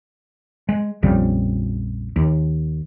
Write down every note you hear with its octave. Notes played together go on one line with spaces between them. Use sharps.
G#3
A#1 F2 C#3 G3
D#2